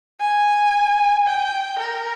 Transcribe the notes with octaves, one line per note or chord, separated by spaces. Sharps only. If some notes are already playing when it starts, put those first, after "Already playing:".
G#5
G5
A#4